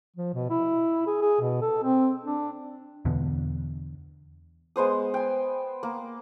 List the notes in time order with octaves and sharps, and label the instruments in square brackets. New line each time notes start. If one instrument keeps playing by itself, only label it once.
[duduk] F3
B2
E4
G#4
G#4
B2
A4
C4
D4
[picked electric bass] E2 B2 D3
[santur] G#3 B3 C5 D#6
G5 G#5
A#3